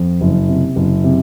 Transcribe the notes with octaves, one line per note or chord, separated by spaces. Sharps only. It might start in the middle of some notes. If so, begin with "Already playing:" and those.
Already playing: F2
F#1
C3
F#1
C3